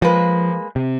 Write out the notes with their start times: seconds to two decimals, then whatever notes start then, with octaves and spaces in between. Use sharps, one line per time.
0.02 F3 G#3 A#3 B4
0.76 C3